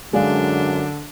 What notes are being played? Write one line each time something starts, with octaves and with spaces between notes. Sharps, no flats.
F#2 D3 G#3 D4 D5 F5